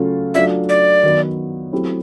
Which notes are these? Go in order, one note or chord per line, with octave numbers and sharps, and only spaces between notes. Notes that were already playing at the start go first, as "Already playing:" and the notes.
Already playing: C#3 F#3 A3 C#4 F4
F#3 A3 D4 F4 E5
D5
D#3 F#3 B3
F#3 A3 C4 E4 G4